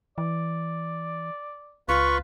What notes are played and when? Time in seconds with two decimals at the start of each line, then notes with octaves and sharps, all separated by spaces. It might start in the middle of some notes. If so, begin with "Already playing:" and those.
0.18 E3 D5
1.89 C#2 F4 B4 F5 C#6